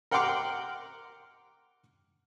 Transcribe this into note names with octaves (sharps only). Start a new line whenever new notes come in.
A#4 F#5 G5 C6 D6 F6